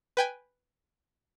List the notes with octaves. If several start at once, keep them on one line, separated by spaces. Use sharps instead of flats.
B4 G5 G#5